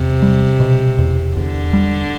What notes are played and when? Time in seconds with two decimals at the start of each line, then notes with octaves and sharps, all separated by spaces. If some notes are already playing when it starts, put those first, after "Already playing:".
Already playing: E2 C3
0.22 G3
0.60 B2
0.98 E2
1.37 E2 D3
1.73 G3